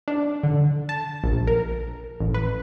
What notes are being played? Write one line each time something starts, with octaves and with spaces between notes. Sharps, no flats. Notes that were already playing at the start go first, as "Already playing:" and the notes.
D4
D3
A5
A#1
A#4
A1
B4